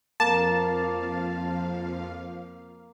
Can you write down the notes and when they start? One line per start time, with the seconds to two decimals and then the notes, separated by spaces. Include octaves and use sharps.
0.20 F2 F3 A#3 F5 A5